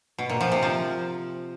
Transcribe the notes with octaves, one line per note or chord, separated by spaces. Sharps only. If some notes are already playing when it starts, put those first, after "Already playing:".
B2
A#2
F3
C3
F3